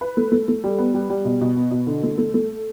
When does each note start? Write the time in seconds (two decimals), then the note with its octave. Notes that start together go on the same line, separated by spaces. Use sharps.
0.01 B4
0.17 A3
0.32 A3
0.48 A3
0.64 G3
0.78 B3
0.94 G3
1.10 G3
1.25 B2
1.41 B2
1.56 B3
1.71 B2
1.87 D3
2.03 A3
2.18 A3
2.34 A3